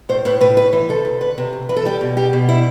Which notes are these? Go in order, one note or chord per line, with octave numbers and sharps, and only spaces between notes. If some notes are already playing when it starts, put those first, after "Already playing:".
A2 C5
A2 B4
A2 B4
D2 B4
E3
C3 A4
D2
D2 B4
C3
D2
E3 B4
A4
G3 G4
B2
G3 G4
B2
G3 E4